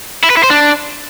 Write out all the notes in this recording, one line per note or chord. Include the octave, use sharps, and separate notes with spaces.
E4
B4
E4
C5
D4